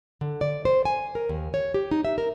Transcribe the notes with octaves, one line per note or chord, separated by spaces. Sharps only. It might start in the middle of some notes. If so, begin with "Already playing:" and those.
D3
D5
C5
G#5
A#4
D#2
C#5
G4
D#4
E5
A#4